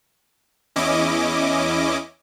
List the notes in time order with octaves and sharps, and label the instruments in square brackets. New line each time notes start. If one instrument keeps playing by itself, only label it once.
[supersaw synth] E2 C#4 E4 D#5 D6